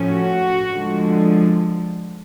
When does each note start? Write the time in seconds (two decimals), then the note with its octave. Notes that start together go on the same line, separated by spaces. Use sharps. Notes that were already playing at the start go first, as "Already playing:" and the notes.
Already playing: A2 F3 A3 C#4
0.09 F#4
0.72 D3 F3 G#3